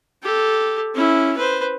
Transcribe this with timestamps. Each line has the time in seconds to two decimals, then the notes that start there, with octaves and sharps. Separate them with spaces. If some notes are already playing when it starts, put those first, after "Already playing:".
0.23 G4 A4
0.95 C#4 E4
1.37 B4 C5